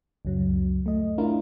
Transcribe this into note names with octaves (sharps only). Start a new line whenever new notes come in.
C#2 F#2 F#3
A3 D#5
A3 D4 E4 F4 A#4